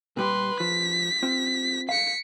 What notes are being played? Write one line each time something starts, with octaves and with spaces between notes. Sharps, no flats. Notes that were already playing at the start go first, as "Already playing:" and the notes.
A#2 G3 G4 B4 C6
F3 B6
C4 F4
F5 B6 C#7